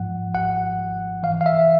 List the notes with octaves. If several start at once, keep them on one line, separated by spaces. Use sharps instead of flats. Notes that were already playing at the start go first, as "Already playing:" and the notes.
Already playing: G#2 F3 F#5
G#1 F#5
G#1
E3 F5
F5
E5